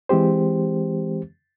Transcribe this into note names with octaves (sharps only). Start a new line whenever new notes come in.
E3 G#3 C4 G4 C5